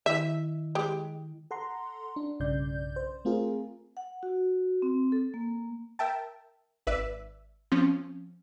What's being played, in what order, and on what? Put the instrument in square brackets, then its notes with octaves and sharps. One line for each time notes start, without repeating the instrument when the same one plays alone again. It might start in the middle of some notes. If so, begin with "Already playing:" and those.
[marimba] D#3 E4 [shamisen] E5
[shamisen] G#3 G4
[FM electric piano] A4 F#5 A#5 C6
D4
B1 G2 C#3 D5 G6
C5
A3 C4 F4 G#4 A#4
[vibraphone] F#5
F#4
C4
A4
A#3
[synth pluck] A#4 E5 G5 A5
G#1 B4 D5 E5
F3 C4 C#4